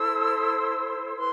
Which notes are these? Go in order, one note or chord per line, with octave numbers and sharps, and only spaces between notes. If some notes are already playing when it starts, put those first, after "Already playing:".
Already playing: E4 A4 C5 E6
E4 B4 C6